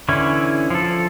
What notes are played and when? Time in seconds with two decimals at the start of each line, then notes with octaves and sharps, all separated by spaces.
0.09 D3 E3 C#4 E4
0.70 F3 A4